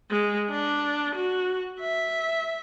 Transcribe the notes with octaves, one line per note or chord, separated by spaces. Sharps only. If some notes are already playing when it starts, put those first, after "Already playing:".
G#3
D4
F#4
E5